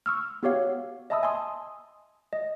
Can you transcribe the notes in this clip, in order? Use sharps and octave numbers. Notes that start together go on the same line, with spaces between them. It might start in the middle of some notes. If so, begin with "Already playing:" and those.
C#6 E6 F6
B3 F#4 G4 C#5 F5 F#5
D#5 E5 A5 B5 D#6 E6
G#5 A5 C6 D#6
D#5